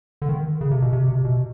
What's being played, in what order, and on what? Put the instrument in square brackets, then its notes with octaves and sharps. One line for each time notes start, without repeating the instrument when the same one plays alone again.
[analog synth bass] D3
D#3
C#3
C3
B2
C3
C3
B2